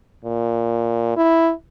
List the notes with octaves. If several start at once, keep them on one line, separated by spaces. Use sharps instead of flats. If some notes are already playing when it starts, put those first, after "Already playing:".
A#2
E4